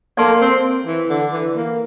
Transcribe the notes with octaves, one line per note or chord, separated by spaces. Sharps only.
A#3 A4 D5 A5 C6
C4
E3
D3
E3
A#3